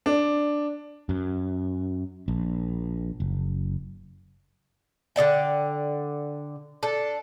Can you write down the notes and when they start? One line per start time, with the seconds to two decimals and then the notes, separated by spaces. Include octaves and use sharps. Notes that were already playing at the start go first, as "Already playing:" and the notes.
0.06 D4
1.09 F#2
2.28 A#1
3.20 F#1
5.16 D3 A4 D5 G5
6.83 D4 A4